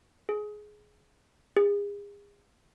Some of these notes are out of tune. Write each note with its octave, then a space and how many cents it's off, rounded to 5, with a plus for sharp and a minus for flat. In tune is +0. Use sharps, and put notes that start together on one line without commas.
G#4 +15
G#4 -35